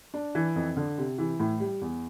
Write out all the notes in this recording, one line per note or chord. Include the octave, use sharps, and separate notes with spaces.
D4
E3
F2
D3
C3
E3
A2
G3
E2